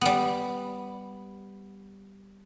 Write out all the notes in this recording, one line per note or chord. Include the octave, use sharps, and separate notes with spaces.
G3 B3